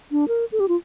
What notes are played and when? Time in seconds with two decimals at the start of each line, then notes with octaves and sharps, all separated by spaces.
0.12 D4
0.28 A#4
0.52 A4
0.60 G4
0.68 F4